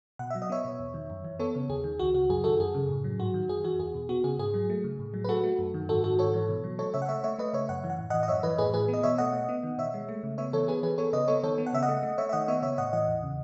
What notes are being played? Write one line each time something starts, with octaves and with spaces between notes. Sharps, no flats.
B2 F#5
F#3 E5
D#5
B3 C#5 E5
B2
E2
D#3
F#2
E3
B3 A4 C#5
C#3
D#2 G#4
D#3
C#2 F#4
C#3 F#4
F#2 G#4
D#3 F#4 A4
F#2 G#4
C#3
A2
F#3
G#2 F#4
D#3
F#2 G#4
E3 F#4
E2 G#4
B2
B3 F#4
C#3 G#4
G#2 G#4
F#3
A3
C#3
A2
F#3
B4
A3 F#4 A4
A3
F#2
D#3
G#2 F#4 A4
D#3 F#4 A4
G#2 A4 C#5
E3
B2
F#3
A3 A4 C#5
C#3 C#5 E5
F#5
A3 C#5 E5
A3 C#5 E5
A3 B4 D#5
C#3 C#5 E5
F#2 F#5
E3
F#5
A2
E3 D#5 F#5
D#5
F#2 C#5 E5
E3 B4 D#5
A2 G#4 B4
E3 G#4 B4
B3
D#5
B2 C#5 E5
A3 D#5 F#5
A3
B3
D#3
B2 C#5 E5
G#3
A3
C#3
B3 C#5 E5
E3 A4 C#5
B3 G#4 B4
E3 G#4 B4
B3 A4 C#5
C#3 B4 D#5
B3 A4 C#5
D#3 A4 C#5
B3
F#5
C#3 E5
D#5 F#5
A3
A3
A3 C#5 E5
E5
D#3 D#5 F#5
B3 C#5 E5
C#3 C#5 E5
A2 D#5 F#5
E3 D#5 F#5
E2
C#3